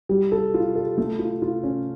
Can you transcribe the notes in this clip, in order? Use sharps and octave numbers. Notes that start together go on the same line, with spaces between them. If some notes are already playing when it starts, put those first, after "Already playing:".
G3
A4
F4
A4
A3
F4
F4
C#4